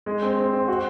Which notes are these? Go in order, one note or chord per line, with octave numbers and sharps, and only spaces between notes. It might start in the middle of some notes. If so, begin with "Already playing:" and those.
G#3
C4
C4
C4
F#4